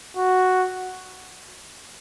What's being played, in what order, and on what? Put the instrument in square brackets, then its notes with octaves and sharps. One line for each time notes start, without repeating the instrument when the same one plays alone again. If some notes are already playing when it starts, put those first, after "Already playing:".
[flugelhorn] F#4